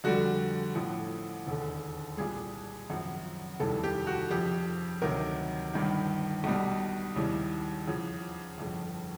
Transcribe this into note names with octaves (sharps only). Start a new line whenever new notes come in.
F2 D3 G3 F#4
A1 A2 F3
E1 D#2 D3
C2 A#2 G3 G#4
G#1 F#2 C#3 F3
F1 D#2 C#3 E3 G3 A4
G4
F#4
F2 C#3 F3 G4
D2 C3 D#3 F#3 A#4
G1 G2 D#3
B1 B2 G3
D#2 C#3 E3 G3
E2 C#3 F3
G1 F2 C#3